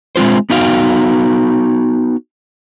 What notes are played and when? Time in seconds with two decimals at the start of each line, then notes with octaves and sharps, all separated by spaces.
0.16 G#3 C4 F4 C5
0.50 B3 D#4 F#4 F5 G5